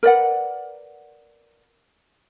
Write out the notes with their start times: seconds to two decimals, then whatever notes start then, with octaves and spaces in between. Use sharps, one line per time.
0.03 A#4 B4 D5 F#5